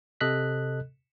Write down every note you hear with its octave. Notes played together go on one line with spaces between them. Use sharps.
C3 A4 D#5 F#6 B6